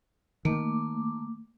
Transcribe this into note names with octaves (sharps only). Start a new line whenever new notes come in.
D#3 A3 A#3 D6